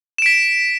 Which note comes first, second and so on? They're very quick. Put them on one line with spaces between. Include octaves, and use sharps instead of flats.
E7 D7 B6